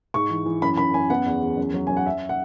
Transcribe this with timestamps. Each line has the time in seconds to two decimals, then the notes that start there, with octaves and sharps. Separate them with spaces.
0.14 G#2 C#6
0.30 E3
0.46 E3
0.62 F#2 B5
0.77 F#2 B5
0.94 F#2 G#5
1.10 B3 F#5
1.26 E2
1.42 E2
1.57 F#2
1.74 F#3
1.87 F#2 G#5
1.97 F#5
2.06 C#4 E5
2.29 F#5